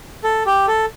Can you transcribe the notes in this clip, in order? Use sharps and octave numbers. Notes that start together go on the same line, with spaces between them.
A4
G4
A4